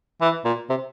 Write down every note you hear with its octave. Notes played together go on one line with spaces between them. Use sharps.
E3
A#2
C3